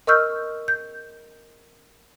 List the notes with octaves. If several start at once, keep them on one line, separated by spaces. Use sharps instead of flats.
A#4 D#5 C#6 E6 F6 G6
G6